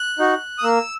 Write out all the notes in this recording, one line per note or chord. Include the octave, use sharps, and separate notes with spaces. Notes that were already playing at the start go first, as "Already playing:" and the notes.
Already playing: F#6
D#4 F#4
D#6
A#3 E6